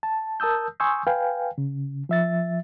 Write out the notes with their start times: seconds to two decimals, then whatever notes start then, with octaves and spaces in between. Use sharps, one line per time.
0.03 A5
0.40 A#4 A5 D#6 E6 G6
0.80 G#5 C6 C#6 D#6 E6 G6
1.07 B4 F5 G5 G#5
1.58 C#3
2.09 F3 E5 A6